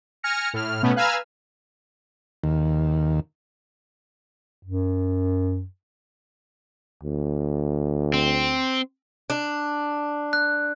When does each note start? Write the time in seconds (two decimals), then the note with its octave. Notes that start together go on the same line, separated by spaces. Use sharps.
0.23 G#5 F6 A#6 C#7
0.54 A2 F6
0.82 B2 A3 B3 C#4
0.96 B4 F5 G#5 A#5 E6 F6
2.44 D#2
4.64 F#2
7.03 D2
8.14 C4
9.30 D4
10.33 F#6